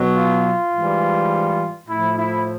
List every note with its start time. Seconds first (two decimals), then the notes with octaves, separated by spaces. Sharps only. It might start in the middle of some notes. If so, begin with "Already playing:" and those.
Already playing: B2 F#3
0.16 F4
0.72 G#2 E3 G3
1.88 A2 F3 E4
2.17 E4